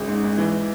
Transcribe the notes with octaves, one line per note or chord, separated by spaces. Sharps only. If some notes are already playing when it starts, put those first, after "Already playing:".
Already playing: G#1 C#3 G#3
G#2
G#2
E3